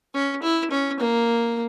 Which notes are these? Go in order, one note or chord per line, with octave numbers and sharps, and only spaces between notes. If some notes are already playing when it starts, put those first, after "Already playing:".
C#4
E4
C#4
A#3